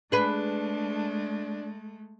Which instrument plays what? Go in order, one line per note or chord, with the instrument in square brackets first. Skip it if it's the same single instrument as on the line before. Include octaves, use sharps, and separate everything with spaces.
[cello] G#3 A3 [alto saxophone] D4 [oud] G#4 B4